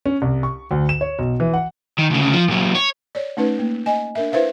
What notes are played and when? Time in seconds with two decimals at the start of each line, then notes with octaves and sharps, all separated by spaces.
0.06 C#4
0.22 C2
0.43 C#6
0.71 D2
0.89 E7
1.01 C#5
1.19 B1
1.40 E3
1.54 F#5
1.99 D#3
2.11 D2 C#3
2.34 F3
2.48 A#2 F#3
2.75 C#5
3.15 C#5 D5
3.37 A3 C#4 D#4 B4
3.59 A#3
3.86 D#5 G#5
4.15 D4 A#4 E5
4.32 E4 B4 C5 E5 F5